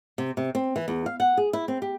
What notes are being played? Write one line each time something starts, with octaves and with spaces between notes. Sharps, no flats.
C3
C3
C4
E3
E2
F5
F#5
G#4
E4
C4
G4